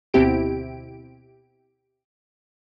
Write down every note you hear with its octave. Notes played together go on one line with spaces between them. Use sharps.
D2 B2 C4 E4 G4 D7